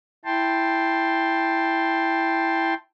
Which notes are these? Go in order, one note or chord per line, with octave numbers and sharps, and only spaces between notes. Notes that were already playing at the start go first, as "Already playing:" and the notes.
E4 G5 A5 C6